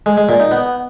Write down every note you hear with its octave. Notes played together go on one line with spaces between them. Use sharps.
G#3
G#3
A#2
D#4
B3